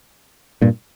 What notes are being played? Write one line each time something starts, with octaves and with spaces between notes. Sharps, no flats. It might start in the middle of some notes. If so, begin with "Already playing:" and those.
G2 A#2